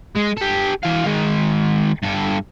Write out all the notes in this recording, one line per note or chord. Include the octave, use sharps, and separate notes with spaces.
G#3
G4 A4
E3 F5
D#3 G#3
G2 A4